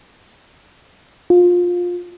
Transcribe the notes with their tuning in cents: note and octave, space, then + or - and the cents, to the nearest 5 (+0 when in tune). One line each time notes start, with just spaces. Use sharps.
F4 +20